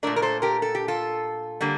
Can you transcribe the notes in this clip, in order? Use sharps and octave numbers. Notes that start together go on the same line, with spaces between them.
A#2 A3 D4 A#4 D5
A#4
A4 C5
G4 A#4
A4
G4
F4 A4
D3 G3 A#3